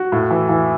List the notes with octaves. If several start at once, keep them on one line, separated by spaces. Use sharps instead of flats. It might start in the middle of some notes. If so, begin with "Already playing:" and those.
Already playing: F#4
A2
E3
E3